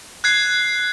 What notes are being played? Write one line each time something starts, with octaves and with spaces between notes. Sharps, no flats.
F#6 G#6 C7